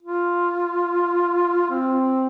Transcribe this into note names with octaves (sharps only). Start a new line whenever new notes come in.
F4
C4